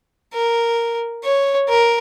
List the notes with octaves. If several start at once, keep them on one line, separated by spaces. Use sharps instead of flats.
A#4
C#5
A#4